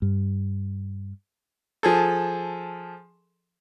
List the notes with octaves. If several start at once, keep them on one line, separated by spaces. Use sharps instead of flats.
G2
F3 G#4 A4